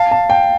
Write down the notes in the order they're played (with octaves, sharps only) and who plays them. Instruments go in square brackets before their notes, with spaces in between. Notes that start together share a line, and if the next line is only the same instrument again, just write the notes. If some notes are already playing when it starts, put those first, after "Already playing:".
Already playing: [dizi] F5 [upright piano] A5
[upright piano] A5
G5